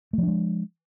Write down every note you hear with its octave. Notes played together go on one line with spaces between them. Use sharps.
F3 G#3 A3 D4